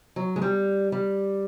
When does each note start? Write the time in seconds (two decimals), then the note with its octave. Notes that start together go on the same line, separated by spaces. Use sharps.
0.16 F#3
0.36 G#3
0.42 G3
0.92 G3